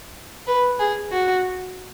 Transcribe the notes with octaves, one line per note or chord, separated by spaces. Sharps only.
B4
G#4
F#4